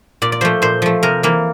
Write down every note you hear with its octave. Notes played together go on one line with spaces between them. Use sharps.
A#2 D5
D5
F3 A3 C5
A#2 C5
F3 A3
C3 A#4
E3 A#3